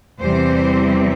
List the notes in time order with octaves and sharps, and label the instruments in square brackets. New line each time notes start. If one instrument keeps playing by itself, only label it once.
[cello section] E2 C3 E3 G3 C4 C5